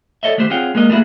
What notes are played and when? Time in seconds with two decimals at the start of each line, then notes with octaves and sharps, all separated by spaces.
0.23 A4 C#5 D#5 E5
0.38 D#3 A3 B3 G4 C5
0.50 C4 F4 G#4 C#5 F#5 G5
0.75 G#3 A#3 A#4 D#5
0.89 G3 A3 A#3 E4 F#4 G#4